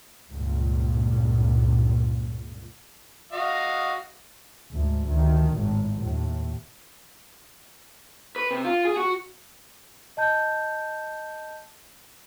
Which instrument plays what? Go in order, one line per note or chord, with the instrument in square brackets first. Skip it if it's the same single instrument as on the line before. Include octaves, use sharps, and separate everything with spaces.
[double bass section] C#2 G2 A#2
[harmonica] F#4 D#5 F5
[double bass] D2 G#2
D2 D#3
G#1 A2
D#2 A2
[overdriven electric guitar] B4
C3
F4
G#4
F#4
[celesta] D#5 A5 G6